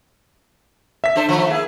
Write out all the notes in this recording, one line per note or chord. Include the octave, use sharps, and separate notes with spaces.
E5 B6
D4 A4 C5
D#3 F3 A3
A#3 E4 G#4